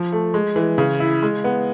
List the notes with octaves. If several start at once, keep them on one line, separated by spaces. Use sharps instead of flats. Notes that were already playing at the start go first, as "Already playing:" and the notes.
Already playing: F3
A3
G#3
E3
C#3
E4
G#3
B3